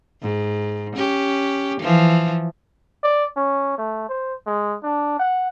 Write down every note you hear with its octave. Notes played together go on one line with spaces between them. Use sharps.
G#2
C#4 G4
E3 F3
D5
C#4
A3
C5
G#3
D4
F#5